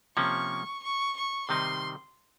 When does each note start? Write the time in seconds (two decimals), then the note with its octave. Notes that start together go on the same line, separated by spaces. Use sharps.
0.17 C3 F3 A#3 C#4 C#6
0.83 C#6
1.17 C#6
1.49 C3 D#3 G3 C4 D#4 C6